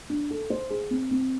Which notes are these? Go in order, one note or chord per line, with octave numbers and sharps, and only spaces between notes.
D4
A4
C5
G#4
C4
C4